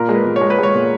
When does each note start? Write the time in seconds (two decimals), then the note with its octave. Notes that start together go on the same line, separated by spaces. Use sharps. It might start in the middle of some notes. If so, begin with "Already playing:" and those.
Already playing: A#2 A#4
0.09 G#3
0.15 B4
0.26 A#2
0.36 C#5
0.41 G#3
0.50 B4
0.58 G#3 C#5
0.74 A#2